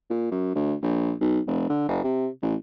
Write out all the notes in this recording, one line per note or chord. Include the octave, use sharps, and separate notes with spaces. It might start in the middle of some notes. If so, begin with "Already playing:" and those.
A#2
F#2
D2
A#1
B1
F1
D3
F#1
C3
A1